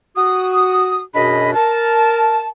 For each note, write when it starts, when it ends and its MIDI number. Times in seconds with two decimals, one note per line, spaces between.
0.16 1.01 66
0.16 1.01 87
1.15 1.54 42
1.15 1.54 47
1.15 1.54 62
1.15 1.54 68
1.15 1.54 75
1.15 1.54 83
1.54 2.48 70
1.54 2.48 81